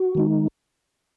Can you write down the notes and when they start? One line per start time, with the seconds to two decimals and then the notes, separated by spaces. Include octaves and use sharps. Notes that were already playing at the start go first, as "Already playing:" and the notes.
Already playing: F#4
0.15 D#3 G#3 D#4